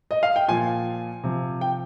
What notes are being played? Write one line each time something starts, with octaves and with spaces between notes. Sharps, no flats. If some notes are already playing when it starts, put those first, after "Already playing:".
D#5
F5
G5
A#2 F3 G#5
C3 F3
G5